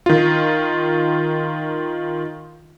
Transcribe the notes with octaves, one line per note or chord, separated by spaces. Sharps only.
D#3 F4